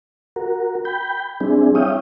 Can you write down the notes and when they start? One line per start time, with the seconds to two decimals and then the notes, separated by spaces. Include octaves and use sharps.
0.36 F#4 A#4
0.85 G5 B5 G6
1.40 G3 C4 D4 E4 G#4
1.75 E4 C#5 E5 F5 G5 D#6